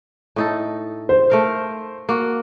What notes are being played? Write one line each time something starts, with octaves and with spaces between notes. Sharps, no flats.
A2 D#4 A4
C5
A3 A#4 F5
A#3 F#4